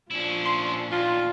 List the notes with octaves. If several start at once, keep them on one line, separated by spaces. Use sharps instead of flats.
A#2 F3 C#4 D4 E4
C6
D#2 F4